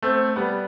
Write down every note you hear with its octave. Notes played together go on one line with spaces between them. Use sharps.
A3 C4
G3 B3